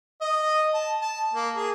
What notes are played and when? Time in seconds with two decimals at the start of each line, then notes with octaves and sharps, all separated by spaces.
0.21 D#5
0.74 A5
1.02 A5
1.34 A#3
1.55 G#4